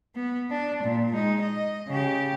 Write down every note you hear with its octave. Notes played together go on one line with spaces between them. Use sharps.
B3
D4
A#2
G#3 D#4
D#5
C#3 G4